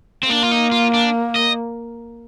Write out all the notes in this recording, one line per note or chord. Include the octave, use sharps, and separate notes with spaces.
C4
A#3 D4
F4
D#4
F4
D4
D#5